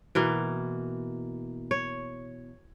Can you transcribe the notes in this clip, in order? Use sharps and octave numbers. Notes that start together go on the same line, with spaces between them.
B2 E3 A#3
C#5